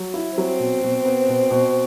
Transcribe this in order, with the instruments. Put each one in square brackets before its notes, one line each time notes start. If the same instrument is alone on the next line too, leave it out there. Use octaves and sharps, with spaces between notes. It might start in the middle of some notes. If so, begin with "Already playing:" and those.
Already playing: [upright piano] F#3
E4
[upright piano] F#3 [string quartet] C4
[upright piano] B2
B2
B3
B2
B2